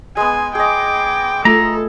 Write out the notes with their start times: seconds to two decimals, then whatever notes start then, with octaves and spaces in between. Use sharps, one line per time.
0.17 G#3 B3 G#5
0.55 G#4 D#5 G5 D6
1.45 A3 F4 A4 A#5